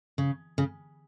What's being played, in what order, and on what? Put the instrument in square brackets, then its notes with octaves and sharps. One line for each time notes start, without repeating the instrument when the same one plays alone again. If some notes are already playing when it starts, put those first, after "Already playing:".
[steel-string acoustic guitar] C#3
C#3